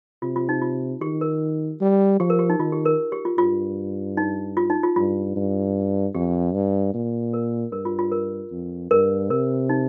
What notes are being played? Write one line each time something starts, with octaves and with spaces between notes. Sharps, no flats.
C3 F4
F4
D#4
F4
D#3 G4
A#4
G3
F3 G4
A#4
G4
D#4
D#3 F4
G4
A#4
G4
F4
G2 F4
D#4
F4
D#4
F4
G2 F4
G2
F2 G4
G2
A#2
A#4
G2 A#4
F4
F4
A#4
F2
G2 A#4
C3 A#4
D#4